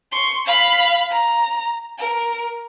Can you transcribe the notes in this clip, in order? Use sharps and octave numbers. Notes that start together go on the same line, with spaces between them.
C6 C#6
F5 B5
A#5
A#4